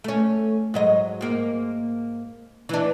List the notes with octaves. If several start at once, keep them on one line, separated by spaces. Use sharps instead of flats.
A3 C#4
G#2 F#3 D#5
G#2 A#3
E3 D4